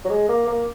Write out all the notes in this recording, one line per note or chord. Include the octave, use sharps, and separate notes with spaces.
F#3
G#3
A#3
A#3